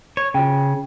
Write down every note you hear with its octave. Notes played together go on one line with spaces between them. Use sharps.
C#5
C#3 F4 G5